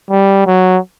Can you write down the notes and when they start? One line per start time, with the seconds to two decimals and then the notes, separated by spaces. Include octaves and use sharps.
0.10 G3
0.47 F#3